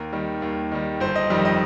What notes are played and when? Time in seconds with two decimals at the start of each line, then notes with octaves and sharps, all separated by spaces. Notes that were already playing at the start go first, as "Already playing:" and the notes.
Already playing: D#2 A#4
0.12 D#3 G3
0.42 D#2
0.72 D#3 G3
1.00 G1 C5
1.16 D#5
1.30 F2 D#3 G3
1.45 D#5